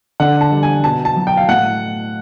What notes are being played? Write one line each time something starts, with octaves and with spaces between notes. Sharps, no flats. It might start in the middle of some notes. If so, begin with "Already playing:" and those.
D3 F#5
A5
G3
G#5
B2 A5
A5
F#3
G5
F5
A2 F#5